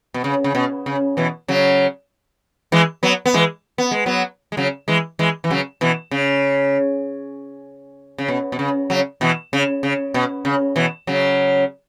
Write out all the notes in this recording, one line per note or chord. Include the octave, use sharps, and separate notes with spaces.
B2
C#3
C#3
B2
C#3
B2 E3
C#3 F#3
E3 G#3
F#3 B3
B3
E3 G#3
B3
G#3
F#3 B3
G#3
C#3 F#3
E3 G#3
E3 G#3
E3
C#3 F#3
B2 E3
C#3
C#3
B2
B2
C#3
C#3 F#3
B2 E3
C#3
C#3
B2
C#3
B2 E3
C#3 F#3